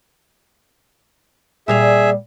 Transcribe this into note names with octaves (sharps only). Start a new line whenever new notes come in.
A#2 G3 G#4 E5 F5